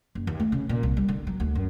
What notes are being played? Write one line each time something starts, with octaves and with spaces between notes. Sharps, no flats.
F#1
D#2
A3
C#3
A#2
C2
G3
D3
F#3
D2
F#2